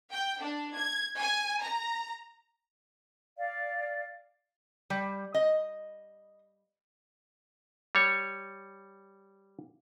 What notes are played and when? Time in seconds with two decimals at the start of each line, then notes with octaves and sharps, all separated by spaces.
0.12 G5
0.42 D4
0.76 G#6
1.21 G#5
1.63 A#5
3.37 D5 F5
4.90 G3
5.34 D#5
7.95 G3 C#5